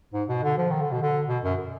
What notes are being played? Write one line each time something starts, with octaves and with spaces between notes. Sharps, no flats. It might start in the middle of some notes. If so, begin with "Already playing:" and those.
G#2
B2
D3
F3
D#3
D3
B2
D3
B2
F#2